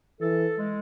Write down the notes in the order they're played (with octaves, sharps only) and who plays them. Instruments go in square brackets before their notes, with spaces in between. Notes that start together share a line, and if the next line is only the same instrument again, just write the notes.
[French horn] E3 [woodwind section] A4
[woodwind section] G#3